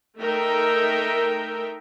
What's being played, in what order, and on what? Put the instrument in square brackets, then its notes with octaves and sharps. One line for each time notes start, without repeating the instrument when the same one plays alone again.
[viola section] A3 D#4 A#4 E5 G5